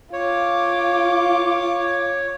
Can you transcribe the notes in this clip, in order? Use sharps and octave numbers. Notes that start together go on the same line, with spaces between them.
F4 C#5 D6